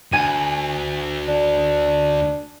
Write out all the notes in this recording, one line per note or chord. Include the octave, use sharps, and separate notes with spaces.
D2 G#5 D#7
D4